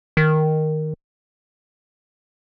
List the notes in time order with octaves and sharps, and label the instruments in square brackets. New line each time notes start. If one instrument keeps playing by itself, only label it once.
[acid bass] D#3